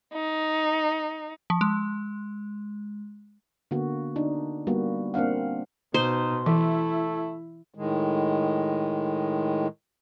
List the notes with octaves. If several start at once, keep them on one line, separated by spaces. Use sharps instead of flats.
D#4
F3
G#3
D3 A#3 B3 F#4
D4 D#4
G3 A#3 B3 F#4
A#3 C4 D4 F5 F#5
B2 D#4 C5
E3 A3 E4
A2 D#3 G#3